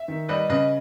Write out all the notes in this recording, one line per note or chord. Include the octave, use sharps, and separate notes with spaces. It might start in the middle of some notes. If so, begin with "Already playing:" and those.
Already playing: E5
D#3
G3 B4 D#5
C#3 B4 D#5